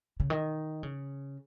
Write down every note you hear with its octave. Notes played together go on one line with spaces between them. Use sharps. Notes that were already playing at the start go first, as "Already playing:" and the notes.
C#3
D#3
C#3